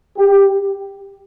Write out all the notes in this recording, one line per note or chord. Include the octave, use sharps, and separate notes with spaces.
G4